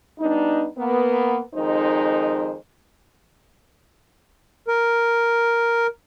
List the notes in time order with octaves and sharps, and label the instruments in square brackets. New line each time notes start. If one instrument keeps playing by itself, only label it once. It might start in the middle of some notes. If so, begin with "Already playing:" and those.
[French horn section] G3 B3 D4 D#4
A#3 B3
F2 D#3 G#3 D#4 C5
[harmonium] A#4